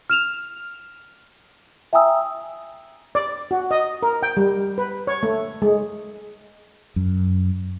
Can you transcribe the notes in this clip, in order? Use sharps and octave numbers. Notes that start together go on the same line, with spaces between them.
F6 E7 F7
E5 G5 G#5 A#5 D#6 E6
D5
F#4
D#5
A#4
G5
G3
B4
C#5
A3
G#3
F#2